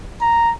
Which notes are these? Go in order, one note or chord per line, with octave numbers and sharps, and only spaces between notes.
A#5